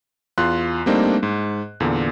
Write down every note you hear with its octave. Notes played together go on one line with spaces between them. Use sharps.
E2 F4 C6 F#6
G3 A3 A#3 C4 D4 D#4
G#2
E2 A#2 D3